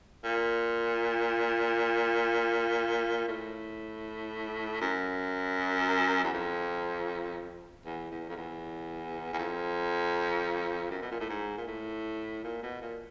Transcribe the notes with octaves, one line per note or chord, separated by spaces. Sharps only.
A#2
A2
F#2
E2
F2
E2
E2
F2
E2
E2
F2
F#2
B2
A#2
A2
G#2
A#2
A2
A#2
B2
A#2